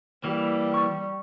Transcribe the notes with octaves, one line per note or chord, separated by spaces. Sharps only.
E3 G3 A#3
C#6 A6